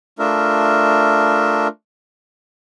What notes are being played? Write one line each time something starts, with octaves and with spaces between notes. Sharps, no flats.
A3 D4 F4 A#4 E5